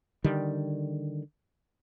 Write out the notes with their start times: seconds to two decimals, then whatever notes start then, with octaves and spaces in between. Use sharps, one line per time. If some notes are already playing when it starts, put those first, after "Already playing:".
0.24 D3 D#3 G3